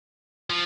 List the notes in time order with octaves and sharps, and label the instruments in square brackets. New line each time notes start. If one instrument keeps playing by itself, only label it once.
[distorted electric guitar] F3